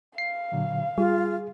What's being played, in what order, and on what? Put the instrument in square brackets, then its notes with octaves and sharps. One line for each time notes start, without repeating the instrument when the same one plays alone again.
[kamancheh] F5 [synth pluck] C7
[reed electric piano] A#2 D3 F#3
[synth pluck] G3 [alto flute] F4 [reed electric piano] G#4